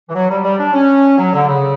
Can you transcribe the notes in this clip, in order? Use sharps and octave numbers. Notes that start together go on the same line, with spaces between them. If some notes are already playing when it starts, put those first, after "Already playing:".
E3
F#3
G3
G3
D4
C#4
F#3
D3
C#3